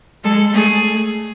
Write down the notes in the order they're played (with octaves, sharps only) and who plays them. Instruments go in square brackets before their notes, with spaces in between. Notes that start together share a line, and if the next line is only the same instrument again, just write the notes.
[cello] G#3 [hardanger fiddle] A4
[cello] A3 [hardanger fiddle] G#4